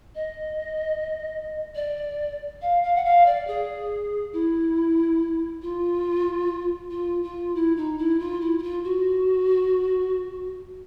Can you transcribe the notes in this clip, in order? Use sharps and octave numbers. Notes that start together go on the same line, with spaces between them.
D#5
D5
F5
F5
F#5
F5
D5
G#4
E4
F4
F4
F4
E4
D#4
E4
F4
E4
E4
F4
F#4